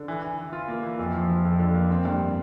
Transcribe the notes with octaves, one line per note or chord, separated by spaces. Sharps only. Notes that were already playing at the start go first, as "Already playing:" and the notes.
Already playing: D3
E3
E3
E3
F4
A#3
E3
F2
F3
F3
F2
D3
A#3
C4
G2